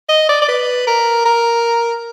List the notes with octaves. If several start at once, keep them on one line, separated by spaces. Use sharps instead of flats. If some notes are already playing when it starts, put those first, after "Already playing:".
D#5
D5
D5
B4
A#4
A#4